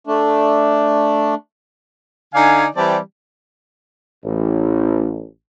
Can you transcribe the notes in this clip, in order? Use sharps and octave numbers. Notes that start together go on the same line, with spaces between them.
A3 D4
D3 D#4 D5 F5 G#5
E3 G3 C4 G4 D5 A5
A1